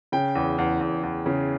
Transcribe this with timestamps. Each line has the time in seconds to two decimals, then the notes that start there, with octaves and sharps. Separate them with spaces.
0.12 C#3 G5
0.35 E2
0.58 E2
0.81 E2
1.03 E2
1.26 C#3